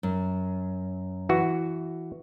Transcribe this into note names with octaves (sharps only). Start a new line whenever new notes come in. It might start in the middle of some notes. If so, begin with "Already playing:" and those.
F#2
E3 F#4